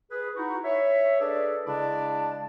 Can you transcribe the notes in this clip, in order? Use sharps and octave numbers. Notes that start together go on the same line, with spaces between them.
G#4 B4
D#4 E4 F#4
C#5 E5
D4 G#4 A4 B4 D5
C#3 G#3 D4 E4 D5 A5